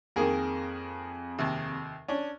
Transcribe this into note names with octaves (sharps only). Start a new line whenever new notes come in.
F2 D#3 A#3 G#4 A#4
D#2 C3
C#4 D4